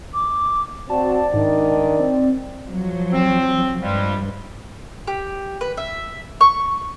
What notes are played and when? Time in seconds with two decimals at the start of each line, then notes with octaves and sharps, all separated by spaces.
0.14 D6
0.90 C4 F#4 D5 A5
1.34 G#2 D#3 D4
1.99 C4
2.67 F3 F#3
3.13 C4
3.82 G2 F3 G3 G#3
5.07 G4
5.61 B4
5.77 E5
6.41 C#6